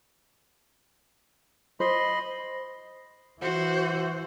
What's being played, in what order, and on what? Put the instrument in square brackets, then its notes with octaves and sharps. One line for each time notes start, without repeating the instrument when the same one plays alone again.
[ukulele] C5 [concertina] D#5 B5 C6
[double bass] E3 [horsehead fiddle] F#4 C5